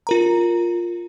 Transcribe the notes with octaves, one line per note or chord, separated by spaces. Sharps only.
F4 A#4 A#5